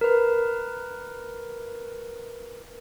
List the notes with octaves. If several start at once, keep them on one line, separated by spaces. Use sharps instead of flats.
A#4 B4